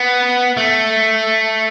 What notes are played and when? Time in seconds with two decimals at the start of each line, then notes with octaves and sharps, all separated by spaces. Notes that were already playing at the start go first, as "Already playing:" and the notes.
Already playing: B3
0.57 A3